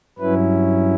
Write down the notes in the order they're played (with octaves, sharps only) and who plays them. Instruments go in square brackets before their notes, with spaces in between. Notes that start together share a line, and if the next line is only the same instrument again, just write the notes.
[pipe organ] G2 F#3 C#4 E4 B4